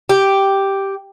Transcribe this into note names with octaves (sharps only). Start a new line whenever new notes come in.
G4